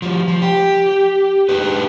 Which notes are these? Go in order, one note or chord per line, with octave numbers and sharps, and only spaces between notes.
F3 G3
F3
G4
D4 D#4 G4 G#4 B4